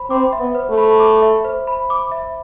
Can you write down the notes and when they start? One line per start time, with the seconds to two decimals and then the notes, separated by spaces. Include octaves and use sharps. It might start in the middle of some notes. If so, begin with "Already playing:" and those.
Already playing: C5 B5
0.09 C4 D6
0.33 E5
0.39 B3
0.55 C5
0.70 A3
0.77 B5
1.00 D6
1.22 E5
1.45 C5
1.67 B5
1.90 D6
2.12 E5